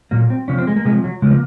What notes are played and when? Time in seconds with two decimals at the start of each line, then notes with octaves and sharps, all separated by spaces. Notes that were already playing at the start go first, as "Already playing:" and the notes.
0.11 A#2 F#3 A#3
0.30 C4
0.48 C3 F3 C#4
0.58 C4
0.67 G#3
0.76 A#3
0.85 C3 F3 G#3
1.04 F#3
1.22 C#3 F3 G#3
1.31 A#3